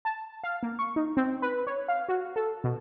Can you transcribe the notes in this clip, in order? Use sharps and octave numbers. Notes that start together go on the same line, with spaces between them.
A5
F5
A#3
C#6
D#4
C4
B4
C#5
F5
F#4
A4
B2